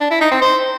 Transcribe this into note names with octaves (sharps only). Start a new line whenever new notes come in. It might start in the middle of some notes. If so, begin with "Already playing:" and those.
D4
E4
D#4
C4
C5